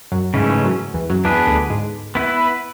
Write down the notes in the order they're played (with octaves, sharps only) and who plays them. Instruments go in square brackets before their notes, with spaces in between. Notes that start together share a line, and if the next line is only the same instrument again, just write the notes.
[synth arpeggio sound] F#2 F#3
[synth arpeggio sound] G#2 G#3 [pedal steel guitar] C#3 E3 A3 C#4
[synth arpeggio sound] G#2 G#3
F#2 F#3
E2 E3
F#2 F#3
[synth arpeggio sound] E2 E3 [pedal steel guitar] B3 D4 G#4 B4
[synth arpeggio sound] D2 D3
G#2 G#3
[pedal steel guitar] B3 E4 B4